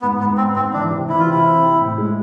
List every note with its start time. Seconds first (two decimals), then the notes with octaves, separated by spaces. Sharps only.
0.01 G#2 B3
0.20 G#2 B3
0.37 B3 C4
0.56 G#2 C4
0.73 E3 D4
0.91 C3
1.09 E3 E4
1.19 F4
1.27 C3 E4
1.45 C4
1.62 C4
1.80 A2
1.98 G#3